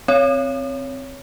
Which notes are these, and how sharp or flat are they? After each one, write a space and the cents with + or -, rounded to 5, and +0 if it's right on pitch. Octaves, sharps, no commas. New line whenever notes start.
C4 +0 C#5 +10